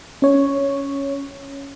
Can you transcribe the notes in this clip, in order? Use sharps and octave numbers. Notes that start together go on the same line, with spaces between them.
C#4 C#5